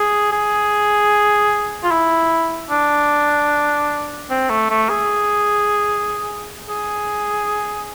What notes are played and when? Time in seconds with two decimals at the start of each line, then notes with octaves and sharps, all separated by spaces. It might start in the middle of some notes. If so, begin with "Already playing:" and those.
Already playing: G#4
0.33 G#4
1.84 F4
1.91 E4
2.71 D4
4.30 C4
4.50 A3
4.70 A3
4.90 G#4
6.70 G#4